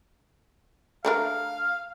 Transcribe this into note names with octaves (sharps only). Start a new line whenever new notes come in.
A3 D4 A#4 F5